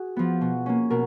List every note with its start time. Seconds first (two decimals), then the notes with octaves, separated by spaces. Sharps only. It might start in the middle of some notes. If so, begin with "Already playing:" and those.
Already playing: F#4 G#4
0.16 F3 B3
0.41 B2
0.66 A#3 C#4
0.90 B2 A#4